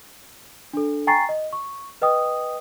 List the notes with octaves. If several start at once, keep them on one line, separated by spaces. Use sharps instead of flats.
D4 A4
G5 G#5 A#5 C#6 A6 C7
D#5
C#6
B4 D#5 G5 D#6